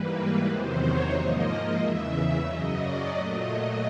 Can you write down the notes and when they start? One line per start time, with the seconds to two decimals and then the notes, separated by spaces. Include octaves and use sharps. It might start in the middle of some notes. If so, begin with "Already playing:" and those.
Already playing: G#2 E3 G3 A#3 B4
0.13 B4
0.46 E2 C3 D#3 F#3 C5
0.79 C#5
1.12 G#2 F3 A#3 D#5
1.77 E2 C#3 E3 E5
2.43 F#2 C#3 F#3 D#5
2.77 D5
3.09 A#2 F#3 A3 D#5